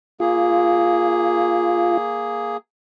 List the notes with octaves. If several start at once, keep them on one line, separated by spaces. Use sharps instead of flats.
A#3 F4 G#4